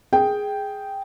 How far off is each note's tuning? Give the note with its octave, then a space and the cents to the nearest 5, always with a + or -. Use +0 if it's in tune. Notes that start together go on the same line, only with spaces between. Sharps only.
G#4 +0 G5 +0